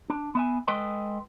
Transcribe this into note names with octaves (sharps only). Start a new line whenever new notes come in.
D4
B3 E5 G#5
G#3 A4 B4 D#5 G5 C6